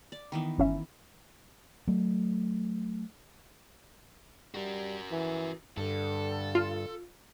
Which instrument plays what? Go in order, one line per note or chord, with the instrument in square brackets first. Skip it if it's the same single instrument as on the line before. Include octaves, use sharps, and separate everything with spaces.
[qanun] D5
D#3 E3 B3
[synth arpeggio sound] G1 C#4 E5
[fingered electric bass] F#3 A3
[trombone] G3 [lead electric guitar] F#4 A#4
[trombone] E3
[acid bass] G2 [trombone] D3 [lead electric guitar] A4
[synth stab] F4